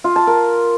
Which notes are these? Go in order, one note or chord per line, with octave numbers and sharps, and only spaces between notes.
F4
A5
A#4